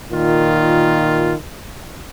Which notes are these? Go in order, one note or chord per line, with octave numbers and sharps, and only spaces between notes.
A#2 D#3 F4